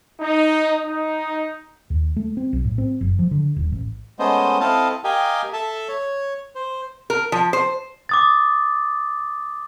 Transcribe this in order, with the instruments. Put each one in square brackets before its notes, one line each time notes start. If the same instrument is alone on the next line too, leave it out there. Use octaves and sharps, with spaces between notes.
[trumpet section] D#4
D#4
[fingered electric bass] D#2
A3
C4
B1
A2
C4
F#1
F3
D3
D#1
A1
[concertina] G#3 A3 B3 C#4 C5 D#5
C4 E4 A4 D#5 F5 A5
G4 A#4 D#5 F5 G5 G#5
A4 E5 A5
C#5
C5
[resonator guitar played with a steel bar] A#4
F3
C5
[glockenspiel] D6 D#6 A6